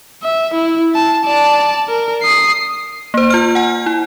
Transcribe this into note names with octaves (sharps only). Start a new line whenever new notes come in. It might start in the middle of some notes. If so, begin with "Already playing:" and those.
E5
E4
A5
D5 A5
A#4
D#6 C7
A#3 C5
F4 F6
F#5 G#5
E4